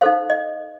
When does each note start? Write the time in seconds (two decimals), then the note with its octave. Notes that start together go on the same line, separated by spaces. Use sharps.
0.01 D#4 A4 C5 F5
0.30 D#5